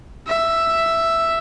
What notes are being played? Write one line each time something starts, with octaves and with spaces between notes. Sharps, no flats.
E5